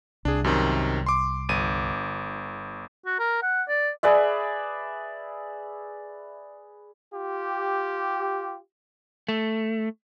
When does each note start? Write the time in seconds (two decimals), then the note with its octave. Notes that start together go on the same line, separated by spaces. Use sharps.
0.25 C2 D4 G#4
0.44 F#2 C3 D#3
1.06 C6 D6
1.49 G1 D#7
3.06 F#4
3.19 A#4
3.42 F#5
3.69 D5
4.03 G#4 B4 D5 E5
7.14 F4 G4
9.28 A3